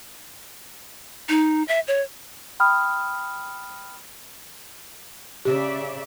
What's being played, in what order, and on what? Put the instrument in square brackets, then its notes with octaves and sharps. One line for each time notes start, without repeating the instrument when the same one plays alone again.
[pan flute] D#4
E5
C#5
[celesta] G5 B5 D#6 F6
[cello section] C#3 D5 E5 [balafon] G4